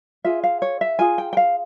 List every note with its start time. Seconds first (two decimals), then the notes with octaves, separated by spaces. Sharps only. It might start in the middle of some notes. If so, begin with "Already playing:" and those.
0.24 F4 G#4 E5
0.44 F5
0.62 C#5
0.81 E5
0.99 F4 G#4 G#5
1.18 G5
1.33 G5
1.37 F5